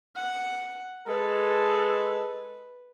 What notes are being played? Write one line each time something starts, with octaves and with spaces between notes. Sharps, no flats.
F#5
G#3 A4 B4